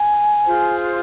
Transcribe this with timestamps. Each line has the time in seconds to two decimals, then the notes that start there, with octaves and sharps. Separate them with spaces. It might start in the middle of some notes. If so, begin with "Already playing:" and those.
Already playing: G#5
0.46 F4 G#4 C5